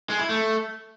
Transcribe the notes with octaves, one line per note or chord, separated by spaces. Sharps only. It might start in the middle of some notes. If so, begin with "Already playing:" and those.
G#3
E4
A3